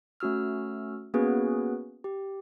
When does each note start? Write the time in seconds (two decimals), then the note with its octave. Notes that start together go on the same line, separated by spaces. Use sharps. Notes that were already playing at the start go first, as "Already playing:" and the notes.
0.20 A3 C#4 F#4 E6 F6
1.14 A#3 B3 C#4 F#4 G#4 B4
2.04 G4